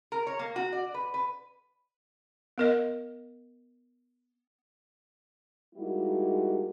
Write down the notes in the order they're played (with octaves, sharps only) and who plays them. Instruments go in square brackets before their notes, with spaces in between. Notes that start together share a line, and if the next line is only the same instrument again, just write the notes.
[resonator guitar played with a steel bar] A#4
C#5
A#3
F#4
D5
B4
B4
[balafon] B3 A#4 D#5
[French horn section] G3 G#3 A#3 D#4 E4 F#4